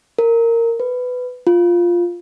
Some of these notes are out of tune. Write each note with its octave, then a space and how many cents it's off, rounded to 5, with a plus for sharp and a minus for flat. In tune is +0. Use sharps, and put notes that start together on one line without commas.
A#4 -15
B4 +15
F4 +0